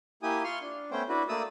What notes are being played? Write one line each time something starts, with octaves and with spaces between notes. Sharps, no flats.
A#3 E4 G4 G#5 D#6
F4 C6 C#6 F6
D4
A3 B3 C#4 C5 G5
D4 E4 F#4 B4
A3 A#3 D5 D#6 E6